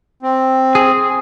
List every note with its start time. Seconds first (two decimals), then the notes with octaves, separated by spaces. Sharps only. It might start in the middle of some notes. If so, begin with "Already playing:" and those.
0.23 C4
0.75 G#4